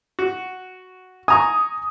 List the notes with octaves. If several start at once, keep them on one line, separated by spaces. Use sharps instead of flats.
F#4
G#5 A#5 C#6 D#6